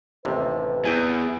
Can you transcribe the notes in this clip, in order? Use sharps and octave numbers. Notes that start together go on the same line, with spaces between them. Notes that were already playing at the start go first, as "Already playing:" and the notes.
A1 D#2 C3 B4
E2 G#4 E5 G5 G#5